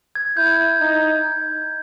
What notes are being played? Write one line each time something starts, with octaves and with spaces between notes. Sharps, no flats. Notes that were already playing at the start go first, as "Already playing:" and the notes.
G#6
E4 G6
D#4